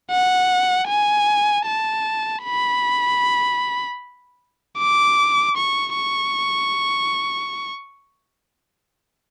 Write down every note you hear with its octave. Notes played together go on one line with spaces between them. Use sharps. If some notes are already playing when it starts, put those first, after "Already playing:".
F#5
G#5
A5
B5
D6
C#6
C#6